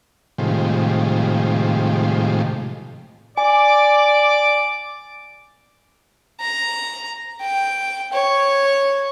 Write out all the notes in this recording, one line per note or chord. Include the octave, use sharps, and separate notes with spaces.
A2 C3 D#3 F3 G3 G#3
D5 G#5 D6
A#5
G5
C#5